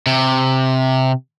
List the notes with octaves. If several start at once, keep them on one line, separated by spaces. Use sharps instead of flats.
C3